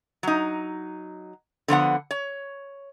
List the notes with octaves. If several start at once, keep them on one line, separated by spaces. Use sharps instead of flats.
F#3 D#4
D3 F3 B3 F#5
C#5